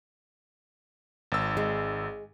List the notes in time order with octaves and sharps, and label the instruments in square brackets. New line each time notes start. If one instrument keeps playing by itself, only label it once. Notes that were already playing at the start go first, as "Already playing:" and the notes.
[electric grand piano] G#1 E6
[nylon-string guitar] G#3